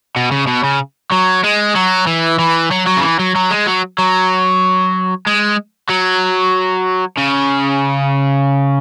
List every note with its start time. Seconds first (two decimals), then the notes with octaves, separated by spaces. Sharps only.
0.16 B2
0.32 C#3
0.47 B2
0.64 C#3
1.12 F#3
1.44 G#3
1.76 F#3
2.07 E3
2.39 E3
2.72 F#3
2.87 F#3
2.97 C#3
3.02 E3
3.19 F#3
3.35 F#3
3.51 G#3
3.67 F#3
3.98 F#3
5.26 G#3
5.90 F#3
7.17 C#3